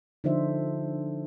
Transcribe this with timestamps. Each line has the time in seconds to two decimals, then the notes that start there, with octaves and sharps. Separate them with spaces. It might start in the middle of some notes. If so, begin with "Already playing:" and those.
0.24 D3 F3 D4 D#4 C5 E5